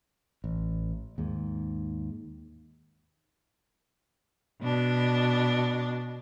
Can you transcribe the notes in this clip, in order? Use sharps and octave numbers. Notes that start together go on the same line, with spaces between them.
A1
D#2 G#2
B2 D4